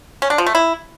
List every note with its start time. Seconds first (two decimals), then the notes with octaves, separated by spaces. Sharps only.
0.22 C#4
0.30 D4
0.38 F3
0.46 A3
0.55 E4